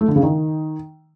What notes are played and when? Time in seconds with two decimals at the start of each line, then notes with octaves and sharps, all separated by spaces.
0.01 A3
0.08 D3
0.16 C#3
0.23 D#3